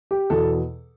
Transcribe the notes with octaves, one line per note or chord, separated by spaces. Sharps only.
G4
E2 B2 A4